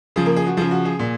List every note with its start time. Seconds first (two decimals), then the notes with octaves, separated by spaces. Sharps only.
0.16 C#3 F3 G#4
0.26 A#3 A#4
0.36 G#4
0.47 F#4
0.57 C#3 F3 G#4
0.71 F#4
0.85 G#4
0.99 A#2